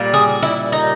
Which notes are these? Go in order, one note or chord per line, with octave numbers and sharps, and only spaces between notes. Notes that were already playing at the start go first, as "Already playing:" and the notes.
Already playing: A#2 G3
G#4
E4
D#4